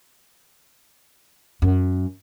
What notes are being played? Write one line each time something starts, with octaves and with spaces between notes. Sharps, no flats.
F#2